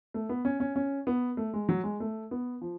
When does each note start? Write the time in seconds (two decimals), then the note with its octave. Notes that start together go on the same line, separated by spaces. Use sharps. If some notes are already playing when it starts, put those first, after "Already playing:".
0.14 A3
0.29 B3
0.45 C#4
0.60 C#4
0.76 C#4
1.07 B3
1.37 A3
1.54 G#3
1.69 F#3
1.84 G#3
2.00 A3
2.31 B3
2.61 F3